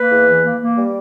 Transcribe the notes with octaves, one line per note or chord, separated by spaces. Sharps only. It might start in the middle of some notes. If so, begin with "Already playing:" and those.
Already playing: A#3 B4
E2
E3
A#3
A#3
G3